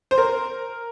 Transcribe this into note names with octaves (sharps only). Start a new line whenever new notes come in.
C5
A#4